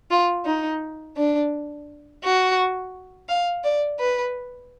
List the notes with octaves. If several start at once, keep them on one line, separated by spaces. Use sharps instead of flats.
F4
D#4
D4
F#4
F5
D5
B4